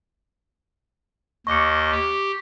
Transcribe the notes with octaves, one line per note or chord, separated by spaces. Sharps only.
D#2 D#5 C#6 D6 C#7
G4